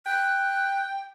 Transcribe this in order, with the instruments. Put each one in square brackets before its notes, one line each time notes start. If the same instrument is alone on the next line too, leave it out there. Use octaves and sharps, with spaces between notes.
[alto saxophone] G5 [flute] F#6